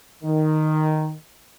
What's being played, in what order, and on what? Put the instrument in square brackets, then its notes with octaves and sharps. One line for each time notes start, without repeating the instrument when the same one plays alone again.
[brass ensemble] D#3